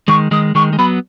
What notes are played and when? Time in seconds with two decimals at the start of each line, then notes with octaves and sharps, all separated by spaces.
0.08 D#3 G#3 C#6
0.31 D#3 G#3 D#6
0.55 D#3 G#3 C#6
0.73 G#3
0.78 F#3 B3 B5